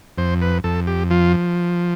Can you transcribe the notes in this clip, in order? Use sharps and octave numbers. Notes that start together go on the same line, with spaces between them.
F2 C5
B4
F2 A4
G4
F3 F4